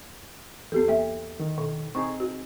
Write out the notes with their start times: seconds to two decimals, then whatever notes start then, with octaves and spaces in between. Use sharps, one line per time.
0.72 E2 B3 G4 A4
0.88 A#3 E5
1.40 D#3
1.58 B2
1.95 C4 D#4 G#4 C#6
2.20 F#4